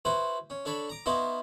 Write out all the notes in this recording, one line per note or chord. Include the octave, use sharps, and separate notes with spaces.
E4 F#4 B4 C5
C#4
D4 A4 C#5 B5
A#5 D6
B3 D#4 E4 F#4 C5 F5